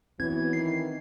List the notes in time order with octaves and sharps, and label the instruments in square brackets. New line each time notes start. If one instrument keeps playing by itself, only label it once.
[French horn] E3 [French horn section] F#3 B3 [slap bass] C4 [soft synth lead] G#6
[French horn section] D#3 [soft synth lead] C7